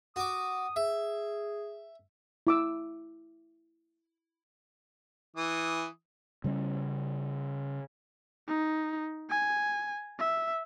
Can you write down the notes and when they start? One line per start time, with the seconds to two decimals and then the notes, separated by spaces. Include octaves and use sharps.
0.16 F#4 D6 D#6
0.76 G#4 E5
2.47 E4 D6 E6
5.37 E3 D#6
6.44 C#3 G3 G#3 C#4
8.48 D#4
9.30 G#5
10.19 E5